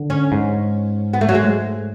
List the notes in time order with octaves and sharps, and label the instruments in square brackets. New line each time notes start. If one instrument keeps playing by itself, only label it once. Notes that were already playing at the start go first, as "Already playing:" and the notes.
Already playing: [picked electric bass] D3
[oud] C#4
[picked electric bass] G#2
[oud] B3
A3
F#3
G#3